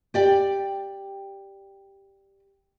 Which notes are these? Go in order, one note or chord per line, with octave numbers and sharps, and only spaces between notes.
G4 D5 G5